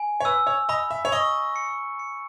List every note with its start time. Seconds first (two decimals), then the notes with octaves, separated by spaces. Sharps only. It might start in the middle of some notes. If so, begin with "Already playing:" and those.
Already playing: G#5
0.20 C#5
0.25 B4 E6
0.47 C#5
0.69 D#5 B5
0.91 E5
1.05 C#5
1.12 D#5 C#6
1.56 C#7
1.99 C#7